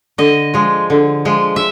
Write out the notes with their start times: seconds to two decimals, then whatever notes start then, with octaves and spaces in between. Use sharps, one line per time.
0.18 D3 D#5
0.54 F3 G#3
0.90 D3
1.25 F3 G#3
1.56 E5